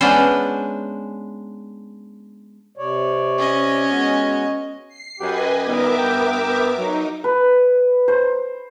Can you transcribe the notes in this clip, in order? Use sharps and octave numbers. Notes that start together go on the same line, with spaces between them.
G#3 B3 C#4 D4 B4 C5
C3 C#5 D5
C#4 D#5
G#3 B3 F#4
C7
F#2 G4 B4 D#5 G#5
A#2 D#3 G3 B3 A#4 E5 D6
G2 G5
B3
F#3 D#4
B4
C5